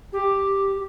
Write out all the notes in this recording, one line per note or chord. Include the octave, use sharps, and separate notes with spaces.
G4